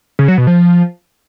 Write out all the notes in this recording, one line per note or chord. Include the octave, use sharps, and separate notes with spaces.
C#3
F#3
B2
F3